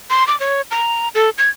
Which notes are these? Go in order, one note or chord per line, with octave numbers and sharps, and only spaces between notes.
C6
D6
C#5
A#5
A4
G#6